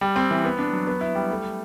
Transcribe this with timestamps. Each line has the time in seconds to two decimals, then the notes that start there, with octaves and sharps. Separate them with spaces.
0.01 G3
0.16 C4
0.31 E3
0.45 B3
0.59 D4
0.73 F#3
0.87 B3
1.01 E4
1.15 G3
1.30 A3